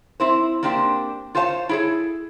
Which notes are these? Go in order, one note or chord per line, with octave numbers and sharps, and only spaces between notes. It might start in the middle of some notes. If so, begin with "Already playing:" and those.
C4 E4 C5
A#3 C4 D4 G4 C5
F4 C5 C#5 F5 A5
E4 G#4 A4